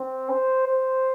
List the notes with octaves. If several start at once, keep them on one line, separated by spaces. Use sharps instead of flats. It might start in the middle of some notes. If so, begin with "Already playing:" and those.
Already playing: C4
C5
C5